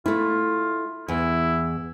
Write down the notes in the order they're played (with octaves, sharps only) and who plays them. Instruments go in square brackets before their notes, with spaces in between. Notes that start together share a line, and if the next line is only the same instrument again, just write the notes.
[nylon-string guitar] A3 E4 [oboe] F4
[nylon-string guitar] E2 [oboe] E4